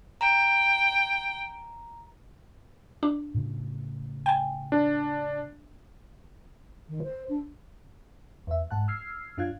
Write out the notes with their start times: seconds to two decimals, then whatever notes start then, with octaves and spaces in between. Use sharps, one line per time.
0.21 G5 A#5
3.03 D4
3.34 A2 C#3
4.26 G5 G#5
4.72 D4
6.89 D#3
7.03 C5
7.29 D4
8.47 E2 E5
8.71 G#2 F#5 A5 F#6
8.88 E6 F6 G#6 C7
9.37 F#2 D4 F4 F5 F#6 G#6